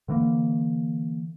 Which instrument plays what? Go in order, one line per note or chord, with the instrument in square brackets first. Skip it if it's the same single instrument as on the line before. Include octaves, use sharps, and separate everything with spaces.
[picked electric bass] D3 E3 A3 A#3